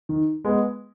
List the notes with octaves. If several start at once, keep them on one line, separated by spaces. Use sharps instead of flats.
D#3
G#3 B3